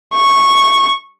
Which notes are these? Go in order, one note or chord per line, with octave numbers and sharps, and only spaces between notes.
C#6